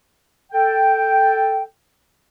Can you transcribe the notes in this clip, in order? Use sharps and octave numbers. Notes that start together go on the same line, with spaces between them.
A4 G5